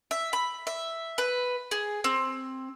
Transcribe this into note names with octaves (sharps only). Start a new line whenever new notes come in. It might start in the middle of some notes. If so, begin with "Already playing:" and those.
E5
B5
E5
B4
G#4
C4